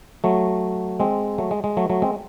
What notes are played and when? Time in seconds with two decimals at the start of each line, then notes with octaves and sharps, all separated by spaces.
0.24 F#3 A3
1.00 G#3 C4
1.38 F#3 A3
1.51 G#3
1.64 G#3
1.77 F#3 A3
1.90 F#3 A3
2.02 G#3 C4